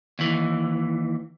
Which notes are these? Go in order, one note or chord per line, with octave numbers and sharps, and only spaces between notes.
D#2 E3